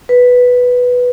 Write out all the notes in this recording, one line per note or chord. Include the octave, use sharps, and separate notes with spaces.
B4